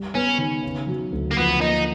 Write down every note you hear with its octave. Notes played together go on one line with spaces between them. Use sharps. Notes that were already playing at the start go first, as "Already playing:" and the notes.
Already playing: G3
B3 C#4
D#3
C#3
F#3
D2
A#3
F3 B3
A#3 D#4